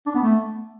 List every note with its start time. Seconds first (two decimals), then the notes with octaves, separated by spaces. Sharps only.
0.06 D4
0.14 B3
0.23 A3